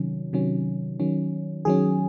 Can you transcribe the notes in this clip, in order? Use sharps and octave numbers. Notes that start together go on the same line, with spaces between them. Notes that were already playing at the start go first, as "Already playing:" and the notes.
Already playing: C3 D#3 F#3 C#4
C3 D#3 F#3 C#4
D#3 F#3 C#4
D#3 F#3 C#4 G#4